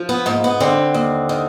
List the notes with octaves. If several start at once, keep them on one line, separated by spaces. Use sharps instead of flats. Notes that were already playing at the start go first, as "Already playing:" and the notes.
Already playing: F3
B3
G#2 A#3
B3
D3 C4
D#2
D#3